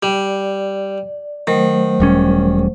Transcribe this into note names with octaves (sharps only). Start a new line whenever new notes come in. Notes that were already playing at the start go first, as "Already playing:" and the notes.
G3 D5
D#3 F#3 A3 C5
E1 G3 C#4